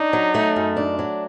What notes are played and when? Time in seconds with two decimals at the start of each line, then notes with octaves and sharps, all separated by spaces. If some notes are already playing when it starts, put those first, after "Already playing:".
Already playing: D4 D#4
0.13 F#3
0.35 A3
0.56 F#2
0.76 D4
0.99 F#3